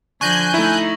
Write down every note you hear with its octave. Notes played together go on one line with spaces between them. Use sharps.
D3 F3 G#5 C#6 F#6 G6 A#6 F#7
A3 D#4 E4